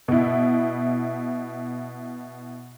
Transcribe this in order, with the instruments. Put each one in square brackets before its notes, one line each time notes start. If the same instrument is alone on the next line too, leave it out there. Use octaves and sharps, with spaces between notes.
[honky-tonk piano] B2 E4